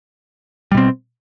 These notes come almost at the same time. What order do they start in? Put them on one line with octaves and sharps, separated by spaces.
G3 B2 C4